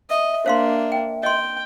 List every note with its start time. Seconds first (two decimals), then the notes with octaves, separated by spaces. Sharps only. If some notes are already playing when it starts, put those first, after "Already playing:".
0.10 D#5 E5
0.46 A#3 D4 C5 F5 C6
0.92 G5
1.23 D#5 G5 C6